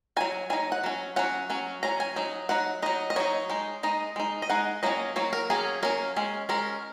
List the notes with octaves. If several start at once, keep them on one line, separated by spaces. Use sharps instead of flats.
F#3 D#4 G#5
F#3 D#4 G#5
F#5
F#3 C#4
F#3 C#4 F#5
F#3 C#4
F#3 C#4 A#5
G#5
F#3 D#4
F#3 D#4 F#5
F#3 D#4 D#5
D#5
F#3 D#4 C#5
G#3 D#4
G#3 D#4 D#5
G#3 D#4
D#5
G#3 D#4 F#5
F#3 A#3 C#4 D#5
F#3 A#3 C#5
A#4
F#3 A#3 C#4 G#4
F#3 A#3 C#4 A#4
G#3 C#4
G#3 C#4 A#4